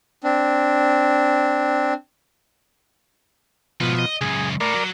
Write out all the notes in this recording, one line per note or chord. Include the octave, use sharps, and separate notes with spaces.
C4 D4
G#2 B2 F3 B4
D#5 E5
C#2 F#2 G#4
A2 A#4 D5
F#3